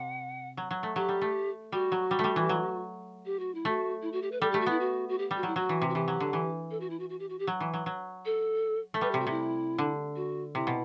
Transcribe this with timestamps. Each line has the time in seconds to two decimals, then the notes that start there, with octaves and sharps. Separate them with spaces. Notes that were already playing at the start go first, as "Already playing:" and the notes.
Already playing: C3 F#5
0.57 F#3
0.71 F#3
0.83 A3
0.96 F#3 G4
1.09 G3
1.21 A3
1.72 G3 F#4
1.92 F#3
2.11 G3
2.19 A3
2.24 G3
2.36 E3
2.49 F#3
3.26 G4
3.39 F#4
3.54 E4
3.65 A3 F#4
4.02 E4
4.13 F#4
4.22 G4
4.32 B4
4.41 G3 A4
4.51 G4
4.54 A3
4.61 F#4
4.66 B3 E4
4.80 F#4
5.09 F#4
5.18 G4
5.31 G3
5.36 F#4
5.43 F#3 E4
5.56 F#3 F#4
5.69 E3
5.82 C3
5.89 F#4
5.95 E3 G4
6.08 F#3
6.20 D3
6.33 E3
6.71 A4
6.80 F#4
6.90 E4
7.00 F#4
7.10 F#4
7.20 G4
7.29 F#4
7.39 G4
7.47 F#3
7.60 E3
7.74 F#3
7.86 F#3
8.25 A4
8.94 A3
9.01 G3 B4
9.11 G4
9.14 C3
9.20 F#4
9.27 C3 E4
9.78 D3
10.16 F#4
10.55 C3 E4
10.67 B2